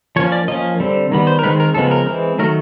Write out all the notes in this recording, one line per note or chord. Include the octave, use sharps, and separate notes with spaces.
F3 A#3 C#4 C#5
D5
F3 A#3 C#4 D#5
D3 G3 C4
D#3 G3 B3
C5
A#4
D#3 G#3 C4 B4
A#4
C#3 F3 G#3 B3 A4
A#4
E3 G#3 C4
D#3 F#3 A3 A#4